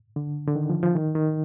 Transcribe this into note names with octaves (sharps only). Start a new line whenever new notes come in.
D3
D3
D#3
F3
F3
D#3
D#3